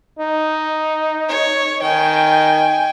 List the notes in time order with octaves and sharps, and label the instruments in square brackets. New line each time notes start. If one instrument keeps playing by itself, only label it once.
[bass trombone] D#4
[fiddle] C#5
[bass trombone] D#3 [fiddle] G5 G#5